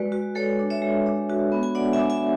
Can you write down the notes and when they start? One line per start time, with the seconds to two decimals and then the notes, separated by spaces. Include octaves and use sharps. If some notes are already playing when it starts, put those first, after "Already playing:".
Already playing: G#3 F#4 B4 D5
0.12 F#4
0.35 G#3 A4 C#5
0.59 D4
0.70 C#5 E5
0.82 G#3
1.06 D4
1.29 F#4
1.52 B3
1.63 G#5
1.75 D4 D5 F#5
1.93 E5 G#5
1.99 D4
2.10 E5 G#5